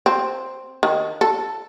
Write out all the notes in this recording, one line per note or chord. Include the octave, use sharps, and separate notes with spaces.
C4
D#3
A4